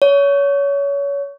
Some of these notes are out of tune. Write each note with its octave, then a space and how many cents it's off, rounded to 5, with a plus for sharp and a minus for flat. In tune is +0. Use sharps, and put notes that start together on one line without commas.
C#5 +25